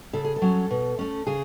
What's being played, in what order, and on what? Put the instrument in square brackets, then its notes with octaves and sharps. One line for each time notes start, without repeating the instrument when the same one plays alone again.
[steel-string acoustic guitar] C#3 A4
G#4
A4
F#3 C#4
B2
A3 C#4
C#3 G#4